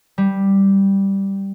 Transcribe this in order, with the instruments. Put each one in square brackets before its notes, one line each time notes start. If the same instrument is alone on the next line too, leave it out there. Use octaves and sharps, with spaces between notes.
[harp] G3